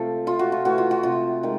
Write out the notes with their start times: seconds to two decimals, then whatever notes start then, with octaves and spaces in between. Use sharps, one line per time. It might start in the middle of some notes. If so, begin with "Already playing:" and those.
Already playing: C3 F3 A3 A4
0.27 C3 F4
0.39 F#4
0.52 F4
0.65 E3 A3 F#4
0.78 F4
0.91 F#4
1.03 C3 F4
1.43 D#3 G#3